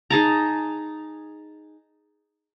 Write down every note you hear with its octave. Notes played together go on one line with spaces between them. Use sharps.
D#4 G#4 A5 A#5